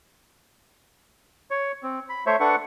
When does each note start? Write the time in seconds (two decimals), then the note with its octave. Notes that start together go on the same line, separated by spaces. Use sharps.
1.51 C#5
1.83 C4
2.09 B5
2.26 A3 C5 C#5 E5
2.40 D4 A4 B4 F#5 C#6